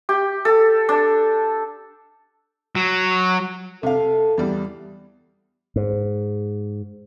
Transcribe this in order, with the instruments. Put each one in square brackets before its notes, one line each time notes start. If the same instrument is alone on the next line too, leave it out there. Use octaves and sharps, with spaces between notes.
[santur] G4
A4
D4
[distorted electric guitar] F#3
[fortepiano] C3 F5 [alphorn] A4
[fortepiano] E2 G3
[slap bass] G#2